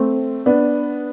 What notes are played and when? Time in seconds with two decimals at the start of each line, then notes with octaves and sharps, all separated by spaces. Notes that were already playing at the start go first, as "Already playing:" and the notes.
Already playing: A3 C4
0.46 B3 D4